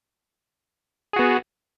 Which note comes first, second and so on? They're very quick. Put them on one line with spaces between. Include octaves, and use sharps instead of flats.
G#4 F#4 B3